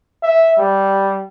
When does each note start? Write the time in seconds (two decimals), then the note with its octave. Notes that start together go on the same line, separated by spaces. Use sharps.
0.23 E5
0.58 G3